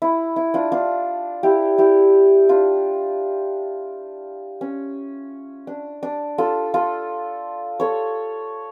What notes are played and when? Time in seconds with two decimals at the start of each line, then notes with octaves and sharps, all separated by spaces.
0.02 E4
0.36 E4
0.54 D4 F4
0.72 D4 F4
1.43 E4 G4
1.78 E4 G4
2.49 D4 F4
4.61 C#4
5.67 D4
6.03 D4
6.38 F4 A4
6.74 F4 A4
7.80 A4 C#5